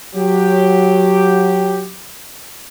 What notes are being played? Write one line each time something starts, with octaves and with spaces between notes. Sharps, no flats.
F#3 G4